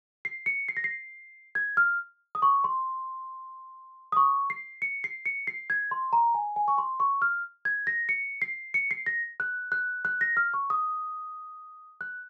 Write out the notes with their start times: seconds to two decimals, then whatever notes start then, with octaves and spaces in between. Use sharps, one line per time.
0.25 C7
0.46 C#7
0.69 C7
0.77 A#6
0.84 C7
1.55 G#6
1.77 F6
2.35 D#6
2.42 C#6
2.64 C6
4.12 D#6
4.17 C#6
4.50 C7
4.82 C#7
5.04 C7
5.26 C#7
5.47 C7
5.70 G#6
5.91 C6
6.13 A#5
6.34 G#5
6.56 G#5
6.68 C#6
6.78 C6
7.00 C#6
7.22 F6
7.65 G#6
7.87 A#6
8.09 C#7
8.42 C7
8.74 C#7
8.91 C7
9.06 A#6
9.40 F#6
9.72 F#6
10.05 F#6
10.21 A#6
10.37 F6
10.54 C#6
10.70 D#6
12.01 F#6